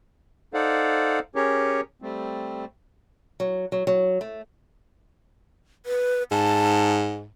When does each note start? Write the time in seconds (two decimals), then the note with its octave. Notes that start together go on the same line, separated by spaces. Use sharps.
0.54 D#4 A4 C5 D5 F5 F#5
1.35 C#4 G4 G#4 A#4 C#5
2.02 G3 A3 C4
3.40 F#3
3.72 F#3
3.87 F#3
4.21 A3
5.86 B4
6.31 G#2 A5